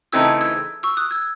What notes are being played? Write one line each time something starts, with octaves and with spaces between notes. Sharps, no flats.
C#3 E3 A3 C4 D#4 E6 G#6
E6 G#6
C#6 E6
D#6 F#6
E6 G#6